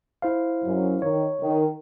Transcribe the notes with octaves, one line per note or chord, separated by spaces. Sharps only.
E4 C5 F5
F#2
D#3 C#5
D#3